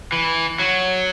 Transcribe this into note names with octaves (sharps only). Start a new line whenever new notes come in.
E3
F#3